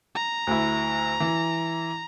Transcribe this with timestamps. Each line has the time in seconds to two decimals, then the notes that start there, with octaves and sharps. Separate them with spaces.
0.15 A#5
0.47 D2 E4
1.20 E3